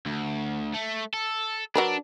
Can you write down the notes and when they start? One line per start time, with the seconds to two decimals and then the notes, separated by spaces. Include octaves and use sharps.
0.06 D2
0.74 A3
1.14 A4
1.75 F#3 D4 A#4 B4